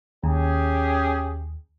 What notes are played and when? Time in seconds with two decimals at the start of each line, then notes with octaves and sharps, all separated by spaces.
0.24 D#2 C#4 G4 G#4